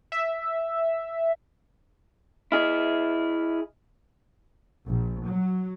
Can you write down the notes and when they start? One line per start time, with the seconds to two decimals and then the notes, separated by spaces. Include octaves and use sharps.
0.12 E5
2.52 E4 G#4 D#5 E5 F6
4.87 A#1
5.27 F#3